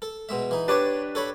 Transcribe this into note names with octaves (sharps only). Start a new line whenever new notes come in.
A4
B2 G#3 E5
E3 D#4
D4 G4 B4 C#5 D5 A5
A4 C#5 B5